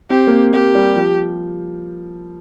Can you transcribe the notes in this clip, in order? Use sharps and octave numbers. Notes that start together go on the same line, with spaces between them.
C4 G4
A#3
C4
A#3 G4
G3
F3